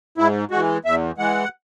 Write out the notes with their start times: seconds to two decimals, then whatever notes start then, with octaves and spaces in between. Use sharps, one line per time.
0.18 G#2 E4
0.51 E3 G#3 F#4
0.85 E2 E5
1.18 E3 G#3 F#5